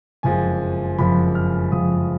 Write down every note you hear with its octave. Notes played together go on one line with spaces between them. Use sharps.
F#1 F2 F3 G#3 G#5
F#1 F2 F3 G#3 B5
F6
F#1 F2 F3 G#3 D#6